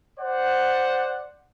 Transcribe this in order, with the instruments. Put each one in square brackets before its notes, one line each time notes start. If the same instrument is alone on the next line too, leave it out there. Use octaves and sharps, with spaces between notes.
[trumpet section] C5 D5 F#5